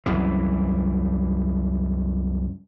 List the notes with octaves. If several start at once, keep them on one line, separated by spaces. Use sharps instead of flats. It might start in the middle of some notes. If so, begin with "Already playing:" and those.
C2 F#2 E3